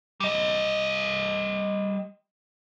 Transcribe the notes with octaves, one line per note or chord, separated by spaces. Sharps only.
G3 D#5